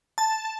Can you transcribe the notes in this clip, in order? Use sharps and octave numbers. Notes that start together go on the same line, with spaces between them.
A5